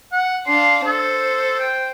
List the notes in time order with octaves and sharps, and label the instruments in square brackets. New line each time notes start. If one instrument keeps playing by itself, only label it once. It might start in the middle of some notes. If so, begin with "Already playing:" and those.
[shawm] F#5
[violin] D4 F5 [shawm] C6
[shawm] A4 [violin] C5
[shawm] G5